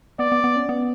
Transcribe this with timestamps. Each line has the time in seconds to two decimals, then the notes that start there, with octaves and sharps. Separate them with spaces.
0.19 B3 D5
0.32 B3
0.44 B3
0.56 C#4
0.69 B3